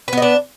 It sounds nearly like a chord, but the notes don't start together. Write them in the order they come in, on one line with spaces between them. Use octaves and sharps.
B4 B3 D#5 D4